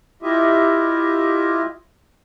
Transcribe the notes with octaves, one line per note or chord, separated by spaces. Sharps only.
E4 F4 G4 D#5 E5